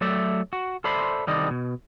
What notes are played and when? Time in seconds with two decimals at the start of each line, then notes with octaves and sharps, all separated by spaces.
0.01 F#3 A3 D5 E5
0.53 F#4
0.84 A4 C5 D5 E5 B5 C6
1.27 C2 D3 D#3 G3 D5 D#5
1.50 B2